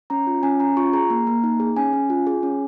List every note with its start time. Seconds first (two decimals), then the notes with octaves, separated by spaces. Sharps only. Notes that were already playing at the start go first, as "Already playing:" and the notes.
0.10 C#4 A#5
0.27 F4
0.43 C#4 G#5
0.60 C#4 A#5
0.77 F4 C#6
0.93 G#4 A#5
1.10 A#3
1.27 A#3
1.44 D#4
1.60 G#4
1.76 C#4 G#5
1.93 C#4
2.10 F4
2.27 G#4
2.43 C#4